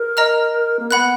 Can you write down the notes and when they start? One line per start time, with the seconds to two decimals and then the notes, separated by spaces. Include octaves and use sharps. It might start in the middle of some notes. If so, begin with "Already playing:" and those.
Already playing: A#4
0.17 D#5 A#5 F6
0.80 A#3
0.90 B3 F#5 B5 F#6